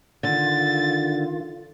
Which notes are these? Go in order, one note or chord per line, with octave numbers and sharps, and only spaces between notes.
D3 D#3 F4 A6